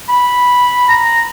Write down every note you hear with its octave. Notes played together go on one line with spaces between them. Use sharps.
B5
A#5